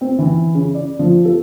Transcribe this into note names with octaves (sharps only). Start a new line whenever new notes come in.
C4
E3
C#3
D5
F3
A4